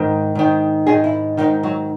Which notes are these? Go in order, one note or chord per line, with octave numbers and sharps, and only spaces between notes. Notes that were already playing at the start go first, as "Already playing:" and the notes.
Already playing: G#2 D#3
G#2 D#3
G#2 D#3 G#4
E4
G#2 D#3 D#4
F#3